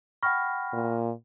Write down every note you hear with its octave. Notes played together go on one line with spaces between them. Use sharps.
F#5 G5 B5 C#6 F6 A#6
A#2